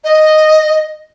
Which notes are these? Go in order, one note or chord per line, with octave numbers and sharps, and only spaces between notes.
D#5